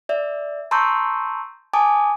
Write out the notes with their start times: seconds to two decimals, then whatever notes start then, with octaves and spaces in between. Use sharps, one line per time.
0.09 D5 E5
0.71 A5 A#5 C6 C#6 E6 G6
1.73 G#5 A5 D6 D#6